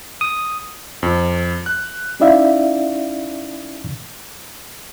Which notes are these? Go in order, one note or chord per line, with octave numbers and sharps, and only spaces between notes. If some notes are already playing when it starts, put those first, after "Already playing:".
D#6
F2
F#6
C#4 D#4 E4 D5 E5 F5